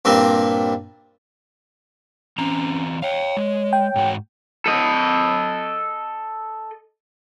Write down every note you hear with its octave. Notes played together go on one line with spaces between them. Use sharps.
G2 A#2 C4
E3 C4 C#4 A#5
C#5 F5 G5
G#3
G5
G#2 F#4
A4 D#5